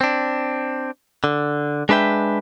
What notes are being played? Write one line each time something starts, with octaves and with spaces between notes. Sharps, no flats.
C4 D4
D3
G#3 D4 B4 E5 G5